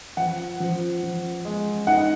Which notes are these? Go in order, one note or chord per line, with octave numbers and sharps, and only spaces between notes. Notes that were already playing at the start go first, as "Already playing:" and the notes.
F3 F#5
F3
F3
G#3
D#4 F#5